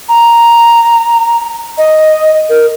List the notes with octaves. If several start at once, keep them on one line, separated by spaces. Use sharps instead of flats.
A#5
D#5
A#4